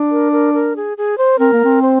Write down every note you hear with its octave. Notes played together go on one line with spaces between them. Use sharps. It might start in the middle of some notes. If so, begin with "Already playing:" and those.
Already playing: D4
A#4
A#4
A#4
G#4
G#4
C5
C4 A#4
A#3
C4
C5